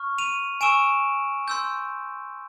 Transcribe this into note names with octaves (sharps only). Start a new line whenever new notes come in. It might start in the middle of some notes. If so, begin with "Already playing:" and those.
Already playing: C#6 F6
D#7 F7
G#5 C#6 E6 D7 E7
C6 E6 G6